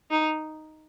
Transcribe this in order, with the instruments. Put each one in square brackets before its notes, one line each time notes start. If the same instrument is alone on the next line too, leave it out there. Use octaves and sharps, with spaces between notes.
[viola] D#4